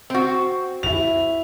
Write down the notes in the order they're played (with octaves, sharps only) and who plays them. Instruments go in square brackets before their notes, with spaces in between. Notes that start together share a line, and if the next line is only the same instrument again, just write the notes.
[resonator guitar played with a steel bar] C4 F#4
[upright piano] E4 F7